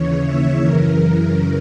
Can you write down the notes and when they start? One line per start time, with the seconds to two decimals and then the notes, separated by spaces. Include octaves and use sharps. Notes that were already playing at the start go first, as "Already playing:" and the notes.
Already playing: D#2 C#3 E3 C#5
0.25 E5
0.63 F#2 C#3 E3 A#4